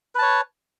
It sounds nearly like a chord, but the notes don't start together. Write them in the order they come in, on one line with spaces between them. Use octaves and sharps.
B4 A5 C#5